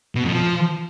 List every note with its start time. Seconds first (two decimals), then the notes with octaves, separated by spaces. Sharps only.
0.15 B2
0.24 F2
0.33 F3